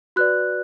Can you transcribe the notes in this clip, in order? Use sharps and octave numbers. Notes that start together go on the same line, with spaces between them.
F#4 B4 D5 F#6